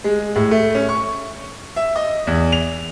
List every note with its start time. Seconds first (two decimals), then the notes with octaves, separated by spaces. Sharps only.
0.04 G#3
0.36 A2
0.51 A3
0.75 C#4
0.89 C#6
1.76 E5
1.96 D#5
2.27 E2
2.52 F7